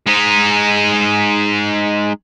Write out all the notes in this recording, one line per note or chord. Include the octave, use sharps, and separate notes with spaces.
G#3 D#4